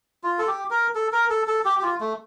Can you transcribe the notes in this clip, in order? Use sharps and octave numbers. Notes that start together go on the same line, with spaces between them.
F4
A4
G4
A#4
A4
A#4
A4
A4
G4
G4
F4
A3